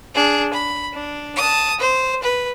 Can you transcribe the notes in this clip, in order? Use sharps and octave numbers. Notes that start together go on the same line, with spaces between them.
D4 G#4
B5
D4
A5 D#6
C5
B4